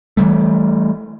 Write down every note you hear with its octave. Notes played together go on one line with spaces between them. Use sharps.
E3 F3 G3 A3